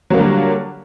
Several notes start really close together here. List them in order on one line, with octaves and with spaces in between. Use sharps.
F#3 A#3 D3 G3